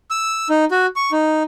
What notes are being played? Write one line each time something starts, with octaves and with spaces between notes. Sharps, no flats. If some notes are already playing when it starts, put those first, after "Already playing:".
E6
D#4
F#4
C#6
D#4